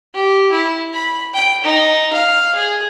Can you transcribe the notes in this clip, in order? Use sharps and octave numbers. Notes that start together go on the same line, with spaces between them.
G4
E4
B5
G5
D#4
F5
G#4